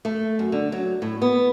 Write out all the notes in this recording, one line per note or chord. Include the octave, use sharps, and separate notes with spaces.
A3
F#2
D3
F#3
A2
B3